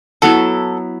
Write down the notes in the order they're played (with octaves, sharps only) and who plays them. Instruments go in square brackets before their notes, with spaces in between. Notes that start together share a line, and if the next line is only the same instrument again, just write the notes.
[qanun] F#3 B3 E4 [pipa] F#4 A4